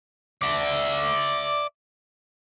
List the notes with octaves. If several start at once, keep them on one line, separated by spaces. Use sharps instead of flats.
D5 E5